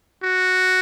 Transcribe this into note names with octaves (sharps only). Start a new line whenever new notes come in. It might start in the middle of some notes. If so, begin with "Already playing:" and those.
F#4